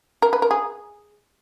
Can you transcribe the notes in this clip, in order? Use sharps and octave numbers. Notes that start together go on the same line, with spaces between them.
A#4
B4
A#4
G#4